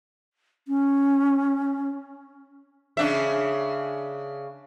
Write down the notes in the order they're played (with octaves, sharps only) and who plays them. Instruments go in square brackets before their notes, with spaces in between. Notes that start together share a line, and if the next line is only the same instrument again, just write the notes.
[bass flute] C#4
[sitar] C#3 D4 E5